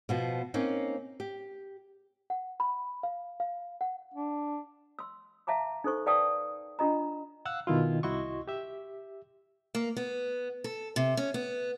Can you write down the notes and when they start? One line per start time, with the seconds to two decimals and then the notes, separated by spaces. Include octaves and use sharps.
0.09 B2 F3 B3
0.54 A#3 C4 C#4 D#4
1.20 G4
2.30 F#5
2.60 B5
3.03 F5
3.40 F5
3.81 F#5
4.14 D4
4.99 C6 E6
5.47 E5 F5 A5 A#5 D6
5.84 D#4 A4 C5 C#6
6.06 B4 D5 F5 G5 A5 D#6
6.79 D4 F4 D#5 A#5
7.45 F5 F#5 E6 F#6
7.67 B2 D#3 E4 F4
8.03 C2 E4 F#4 D#5 C6 C#6
8.48 G4 E5
9.75 A#3
9.97 B3
10.64 A4
10.96 C3
11.17 C#4
11.34 B3